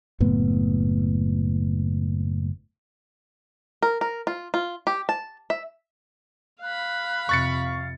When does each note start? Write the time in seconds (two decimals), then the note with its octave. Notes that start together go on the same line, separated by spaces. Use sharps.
0.20 F#1 A2 B3
3.83 A#4
4.01 A#4
4.27 F4
4.54 F4
4.87 G4
5.09 A5
5.50 E5
6.62 F5 B5 F#6
7.29 F2 C3 C#6 A6 C#7
7.61 F5